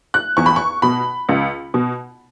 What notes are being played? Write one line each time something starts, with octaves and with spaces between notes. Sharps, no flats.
F#6
E2 C#6
B5
C#6
B2 B5
C#2
B2